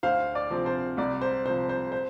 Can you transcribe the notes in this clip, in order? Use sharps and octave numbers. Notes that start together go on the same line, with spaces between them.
D2 C5 F5
D5
C3 F3 C4
C5
C2 D5
C5
C3 F3 C5
C5
C5